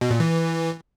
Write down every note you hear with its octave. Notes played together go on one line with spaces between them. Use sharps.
B2
A#2
E3